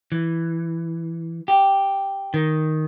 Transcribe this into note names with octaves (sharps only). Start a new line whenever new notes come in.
E3
G4
D#3